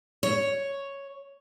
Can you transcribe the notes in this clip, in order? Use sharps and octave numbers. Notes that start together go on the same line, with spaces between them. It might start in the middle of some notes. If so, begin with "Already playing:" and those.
C#5